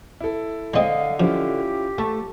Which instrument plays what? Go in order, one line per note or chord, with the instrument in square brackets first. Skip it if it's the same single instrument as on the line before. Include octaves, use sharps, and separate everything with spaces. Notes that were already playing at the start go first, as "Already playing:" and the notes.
[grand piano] E4 A4
[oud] D3 D#5 [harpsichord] G#3 C4 [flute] F5
[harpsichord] F3 [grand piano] C#4 E4 F4 [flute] G4
[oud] A3 [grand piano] A5